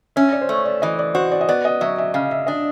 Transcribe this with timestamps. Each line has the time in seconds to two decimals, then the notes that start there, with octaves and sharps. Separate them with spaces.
0.16 C#4 E5
0.33 D5
0.41 C5
0.49 A3 C#5
0.65 D5
0.82 E3 D#5
0.99 D5
1.15 F#4 C5
1.32 D5
1.41 D#5
1.49 B3 D5
1.65 D#5
1.81 F#3 E5
1.98 E5
2.14 C#3 F5
2.31 E5
2.47 D4 D#5